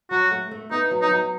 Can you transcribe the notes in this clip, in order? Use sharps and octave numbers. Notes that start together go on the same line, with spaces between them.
F#3 F#4
A3
A3
B3 D#4
F#3
D#4
F#3